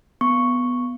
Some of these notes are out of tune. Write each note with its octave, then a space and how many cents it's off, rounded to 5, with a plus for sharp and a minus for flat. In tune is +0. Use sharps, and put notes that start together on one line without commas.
B3 +0 C#6 +0